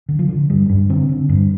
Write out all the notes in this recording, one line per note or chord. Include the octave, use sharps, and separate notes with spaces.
D3
F3
D3
G2 G3
G2 D4
D3 C4
D3
G2